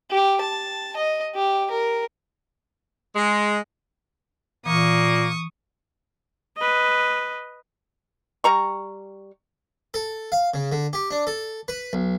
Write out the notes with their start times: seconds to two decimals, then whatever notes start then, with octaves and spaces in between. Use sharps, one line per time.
0.11 G4
0.41 A5
0.96 D#5
1.35 G4
1.71 A#4
3.16 G#3
4.66 A#2 E3 A#3 C#6 D#6
6.57 B4 D#5
8.44 G3 A#5 C#6
9.94 A4
10.32 F5
10.54 C#3
10.72 D3
10.93 G4
11.11 D4
11.27 A4
11.68 B4
11.93 B1